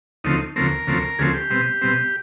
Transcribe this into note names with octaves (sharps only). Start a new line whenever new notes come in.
D2 C#3 F3 A3 C4 D#4
D2 C#3 F3 A3 C4 A#4
D2 C#3 F3 A3 C4
D2 C#3 F3 A3 C4 G#4
G4
B2 G3 C4
B2 G3 C4